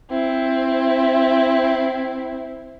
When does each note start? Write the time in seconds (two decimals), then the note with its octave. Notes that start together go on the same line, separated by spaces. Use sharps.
0.11 C4 E4